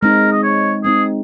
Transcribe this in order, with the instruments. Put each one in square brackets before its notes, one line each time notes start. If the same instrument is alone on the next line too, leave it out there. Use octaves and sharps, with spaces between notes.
[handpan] G#3 C4 D#4 [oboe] A#4
[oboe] D#5
C#5
[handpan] G#3 C4 D#4 [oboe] G#4